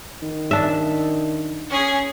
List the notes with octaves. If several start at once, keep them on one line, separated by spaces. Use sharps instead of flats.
D#3
D4 E5
C#4 G#4